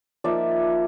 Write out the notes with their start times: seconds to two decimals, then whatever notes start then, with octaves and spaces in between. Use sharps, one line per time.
0.24 F3 A#3 D#4 D5 E5